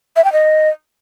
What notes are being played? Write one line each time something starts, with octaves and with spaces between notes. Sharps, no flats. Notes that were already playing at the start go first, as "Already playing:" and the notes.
E5
G5
D#5